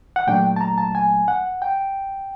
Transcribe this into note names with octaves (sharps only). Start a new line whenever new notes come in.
F#5
A#2 F#3 A3 D4 G5
A5
A#5
A5
G#5
F#5
G5